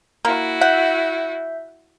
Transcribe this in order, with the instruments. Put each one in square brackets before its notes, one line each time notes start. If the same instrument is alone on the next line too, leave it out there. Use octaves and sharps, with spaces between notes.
[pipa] A#3 [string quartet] E4 F#4
[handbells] E5 G6 [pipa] F#5